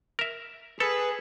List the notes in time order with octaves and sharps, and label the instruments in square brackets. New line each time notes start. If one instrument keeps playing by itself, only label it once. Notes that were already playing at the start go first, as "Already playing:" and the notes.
[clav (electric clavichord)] A#4 E5
[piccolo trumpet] G#4 [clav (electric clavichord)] A4 [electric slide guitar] B4